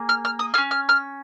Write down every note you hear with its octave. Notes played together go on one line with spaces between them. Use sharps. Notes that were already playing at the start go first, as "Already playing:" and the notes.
Already playing: A#3 G#4
F6
F6
D#6
G#4 F6
C#4
F6
F6